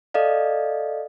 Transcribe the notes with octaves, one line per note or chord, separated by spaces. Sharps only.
A4 D5 D#5 F5